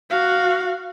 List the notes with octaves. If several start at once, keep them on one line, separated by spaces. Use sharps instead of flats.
F#4 F5